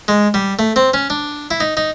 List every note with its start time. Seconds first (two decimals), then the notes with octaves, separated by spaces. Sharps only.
0.08 G#3
0.34 G3
0.59 A3
0.76 C4
0.94 C#4
1.10 D4
1.51 E4
1.60 D#4
1.77 D#4